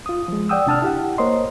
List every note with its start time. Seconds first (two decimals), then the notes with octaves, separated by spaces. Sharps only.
0.06 F4 D#6
0.28 F3 G#3
0.49 D5 F#5 G5 D#6 E6
0.66 C3 D4 A5 E6 F6
0.82 E4 G4 F#5
1.18 A#3 A#4 C5 C#5 D#5 C6